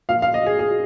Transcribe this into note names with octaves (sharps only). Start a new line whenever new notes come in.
A#2 F3 F5
F5
D#5
G#4
G#4